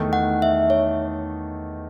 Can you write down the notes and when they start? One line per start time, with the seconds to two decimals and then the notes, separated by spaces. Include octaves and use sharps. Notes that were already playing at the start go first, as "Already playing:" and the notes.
Already playing: E2 D#3 A3 D#4
0.13 F#5
0.42 E5
0.70 C#5